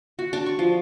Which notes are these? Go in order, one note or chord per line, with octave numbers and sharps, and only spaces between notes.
F#4
D4
C#6
F3